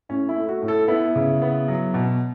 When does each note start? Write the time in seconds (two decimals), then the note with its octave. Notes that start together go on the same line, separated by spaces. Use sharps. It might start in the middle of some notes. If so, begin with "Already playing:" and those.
0.09 A2 C#4
0.29 E4
0.37 A3
0.49 F#4
0.62 A2
0.68 A4
0.88 B3 E4
1.15 C#3
1.42 B3
1.68 F#3
1.94 B2